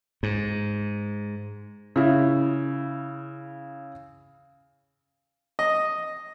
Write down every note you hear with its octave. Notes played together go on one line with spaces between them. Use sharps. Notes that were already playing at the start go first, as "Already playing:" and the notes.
G#2
C#3 E4
D#5